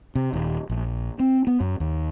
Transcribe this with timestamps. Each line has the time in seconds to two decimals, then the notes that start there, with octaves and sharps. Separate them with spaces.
0.15 C3
0.33 D#1
0.69 A#1
1.20 C4
1.47 B3
1.60 F#2
1.80 D#2